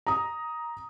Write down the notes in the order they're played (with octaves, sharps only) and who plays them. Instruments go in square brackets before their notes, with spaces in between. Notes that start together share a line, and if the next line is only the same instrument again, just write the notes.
[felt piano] A#5 D#6